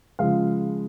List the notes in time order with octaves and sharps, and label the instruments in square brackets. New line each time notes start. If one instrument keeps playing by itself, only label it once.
[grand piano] C#3 F3 G#3 F5